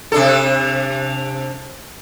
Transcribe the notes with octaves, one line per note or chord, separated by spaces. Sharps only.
C3 D4 A4